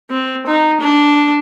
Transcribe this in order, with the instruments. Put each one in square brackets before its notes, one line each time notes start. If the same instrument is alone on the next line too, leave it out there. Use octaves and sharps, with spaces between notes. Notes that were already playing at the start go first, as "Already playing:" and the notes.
[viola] C4
D#4
D4